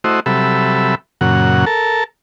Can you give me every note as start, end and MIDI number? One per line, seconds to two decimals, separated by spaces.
0.04 0.20 57
0.04 0.20 64
0.04 0.20 66
0.04 0.20 72
0.04 0.20 75
0.26 0.95 48
0.26 0.95 54
0.26 0.95 55
0.26 0.95 69
0.26 0.95 76
0.26 0.95 83
1.21 1.65 42
1.21 1.65 46
1.21 1.65 49
1.21 1.65 54
1.21 1.65 78
1.66 2.04 69
1.66 2.04 70
1.66 2.04 81